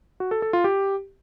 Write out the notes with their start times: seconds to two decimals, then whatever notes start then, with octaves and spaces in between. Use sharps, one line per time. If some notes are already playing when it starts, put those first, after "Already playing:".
0.20 F#4
0.31 A4
0.42 A4
0.53 F4
0.64 G4